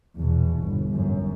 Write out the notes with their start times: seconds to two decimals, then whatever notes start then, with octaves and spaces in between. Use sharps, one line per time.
0.16 E2 B2
0.59 G1
0.94 F#2